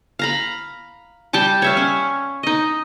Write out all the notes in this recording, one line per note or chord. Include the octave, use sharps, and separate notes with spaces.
F5 A#5 B5
G3 G5 A5 D6
C#5 E5 F5
C#4
D#4 D#5